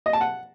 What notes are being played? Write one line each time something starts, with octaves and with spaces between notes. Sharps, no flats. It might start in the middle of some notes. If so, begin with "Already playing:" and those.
D#5
A5
F#5